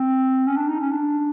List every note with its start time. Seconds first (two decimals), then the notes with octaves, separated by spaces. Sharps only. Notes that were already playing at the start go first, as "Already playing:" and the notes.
Already playing: C4
0.47 C#4
0.57 D4
0.68 D#4
0.80 C#4
0.92 D4